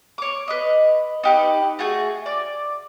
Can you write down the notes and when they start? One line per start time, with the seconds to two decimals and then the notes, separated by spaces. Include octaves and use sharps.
0.18 C#5 D6
0.48 B4 D#5
1.24 D#4 G4 B4
1.79 A3 F#4 G#4
2.26 D5